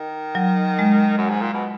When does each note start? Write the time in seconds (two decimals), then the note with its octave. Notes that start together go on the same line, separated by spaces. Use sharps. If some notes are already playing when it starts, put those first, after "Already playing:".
Already playing: D#3
0.35 F#3
0.79 G#3
1.18 F#2
1.30 G#2
1.42 A#2
1.53 B2